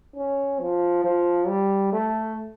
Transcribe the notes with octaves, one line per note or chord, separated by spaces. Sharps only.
C#4
F3
F3
G3
A3